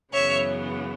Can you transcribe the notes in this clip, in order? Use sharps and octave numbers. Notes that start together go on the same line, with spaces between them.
F#2 C#3 E3 B3 C#5 E5